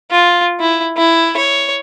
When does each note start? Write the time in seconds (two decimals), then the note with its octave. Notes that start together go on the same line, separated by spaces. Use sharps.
0.11 F4
0.60 E4
0.97 E4
1.37 C#5